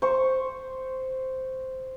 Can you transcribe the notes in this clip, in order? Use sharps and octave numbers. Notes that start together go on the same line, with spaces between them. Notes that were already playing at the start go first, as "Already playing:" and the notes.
C5 C#6